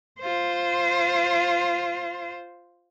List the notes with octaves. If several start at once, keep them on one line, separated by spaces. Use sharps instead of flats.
F4 C5